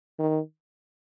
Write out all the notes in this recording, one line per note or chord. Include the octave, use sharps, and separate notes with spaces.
D#3